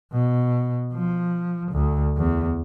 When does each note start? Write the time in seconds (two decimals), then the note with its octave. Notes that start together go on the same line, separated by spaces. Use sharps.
0.12 B2
0.94 F3
1.72 D2
2.17 E2